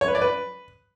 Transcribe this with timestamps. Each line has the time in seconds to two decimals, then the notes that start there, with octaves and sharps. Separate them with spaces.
0.01 C#5
0.08 B4
0.15 D5
0.22 B4